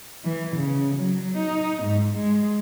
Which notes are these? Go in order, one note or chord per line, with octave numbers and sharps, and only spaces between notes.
E3
C#3
F#3
D#4
G#2
G#3